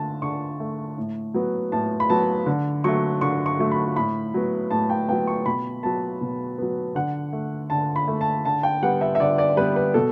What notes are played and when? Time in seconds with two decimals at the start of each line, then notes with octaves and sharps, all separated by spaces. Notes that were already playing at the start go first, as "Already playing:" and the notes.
Already playing: D3 A3 A5
0.22 D3 C#6
0.60 A3
0.98 A2
1.34 F#3 B3
1.72 A2 A5
2.00 B5
2.10 F#3 B3 A5
2.46 D3
2.84 F#3 A3 C#6
3.21 D3 C#6
3.46 C#6
3.59 F#3 A3
3.71 B5
3.96 A2 B5
4.34 F#3 B3
4.71 A2 A5
4.90 G5
5.09 F#3 B3 G5
5.27 C#6
5.46 B2 B5
5.83 F#3 B3 A5
6.21 B2
6.58 F#3 B3
6.95 D3 F#5
7.33 A3
7.70 D3 A5
7.96 B5
8.08 A3
8.21 A5
8.45 D3 A5
8.63 G5
8.82 G3 B3 F#5
9.01 E5
9.15 E5
9.20 D3 D5
9.38 D5
9.57 G3 B3 B4
9.76 B4
9.94 B2 A4